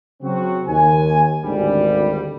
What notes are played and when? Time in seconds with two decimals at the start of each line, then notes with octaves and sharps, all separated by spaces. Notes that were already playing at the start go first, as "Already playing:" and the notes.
0.22 C#3 F#3 C4 F#4
0.67 D#2 G#5
1.44 G#1 D2 A2 D3 G3